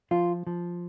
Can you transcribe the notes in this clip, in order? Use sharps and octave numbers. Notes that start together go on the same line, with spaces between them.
F3 F4
F3